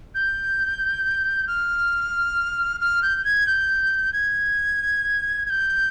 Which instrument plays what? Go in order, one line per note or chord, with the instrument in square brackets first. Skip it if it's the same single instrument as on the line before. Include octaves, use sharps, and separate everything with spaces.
[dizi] G6
F6
F6
G6
G#6
G6
G#6
G#6
G6